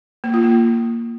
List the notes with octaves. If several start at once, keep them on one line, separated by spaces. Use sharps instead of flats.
A#3
F4
A#3